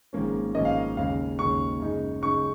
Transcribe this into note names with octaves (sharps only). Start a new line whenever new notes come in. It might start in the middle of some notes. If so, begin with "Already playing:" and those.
G#1 G#2 F3 A#3 C#4
G#1 G#2 F3 A#3 C#4 D#5
F5
D#2 C#3 G#3 F5
D#2 C#3 G#3 C#6
F#2 C#3 G#3 D#4
F#2 C#3 G#3 D#4 C#6